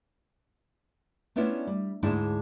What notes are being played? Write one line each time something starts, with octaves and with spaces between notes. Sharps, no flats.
A3 B3 C#4 D4 E4 F4
G3
D2 G#2 G#3 D4 E4 A5